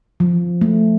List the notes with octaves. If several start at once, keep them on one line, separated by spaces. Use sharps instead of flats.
F3
A3